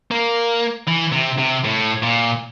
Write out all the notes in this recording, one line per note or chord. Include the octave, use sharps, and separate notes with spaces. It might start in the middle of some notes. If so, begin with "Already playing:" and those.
A#3
E3
C3
C3
A2
A#2